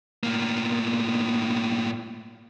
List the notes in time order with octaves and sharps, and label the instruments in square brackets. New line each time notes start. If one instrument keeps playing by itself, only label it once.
[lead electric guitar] A2 A#3